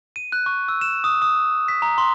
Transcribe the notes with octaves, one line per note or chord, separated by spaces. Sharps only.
D#7
F#6
C#6
E6
E7
D#6
D#6
B6
A#5
C6